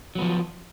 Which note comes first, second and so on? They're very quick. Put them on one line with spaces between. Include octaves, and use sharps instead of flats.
F#3 B3 F3